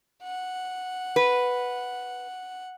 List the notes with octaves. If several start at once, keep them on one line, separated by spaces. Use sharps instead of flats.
F#5
B4